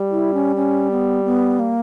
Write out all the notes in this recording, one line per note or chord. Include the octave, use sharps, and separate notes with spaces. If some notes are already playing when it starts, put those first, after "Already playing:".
Already playing: G3
E4
C#4
C#4
B3
B3
A#3